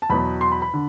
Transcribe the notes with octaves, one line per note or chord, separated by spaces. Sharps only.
A5
E2 B2 F#3 B5
C6
B5
B5
D3